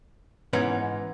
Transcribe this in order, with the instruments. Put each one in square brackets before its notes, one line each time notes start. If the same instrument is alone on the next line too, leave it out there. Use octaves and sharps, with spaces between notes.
[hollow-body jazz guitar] G#2 E3 B3 C#4 D#4